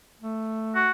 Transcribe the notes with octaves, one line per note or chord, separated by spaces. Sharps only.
A3
F#4